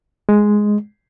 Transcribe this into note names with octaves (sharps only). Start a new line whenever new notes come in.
G#3